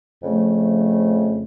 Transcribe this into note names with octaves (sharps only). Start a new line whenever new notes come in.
F2 C#3 F3 A3